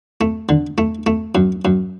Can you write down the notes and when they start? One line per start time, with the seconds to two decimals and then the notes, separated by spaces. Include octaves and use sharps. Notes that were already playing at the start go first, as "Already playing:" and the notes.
0.21 A3
0.49 D3
0.78 A3
1.07 A3
1.35 F#2
1.65 F#2